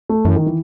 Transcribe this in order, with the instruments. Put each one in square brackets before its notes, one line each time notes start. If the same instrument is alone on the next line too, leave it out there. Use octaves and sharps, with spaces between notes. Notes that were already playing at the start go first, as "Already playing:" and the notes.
[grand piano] A3
[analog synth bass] F#2 [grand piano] E3
[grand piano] D#3
E3